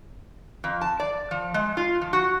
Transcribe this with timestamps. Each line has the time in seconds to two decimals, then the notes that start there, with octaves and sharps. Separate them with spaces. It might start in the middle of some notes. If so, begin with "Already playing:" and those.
0.64 F2
0.81 A5
1.00 D5
1.31 F3
1.54 G#3
1.77 F4
2.02 F3
2.13 F#4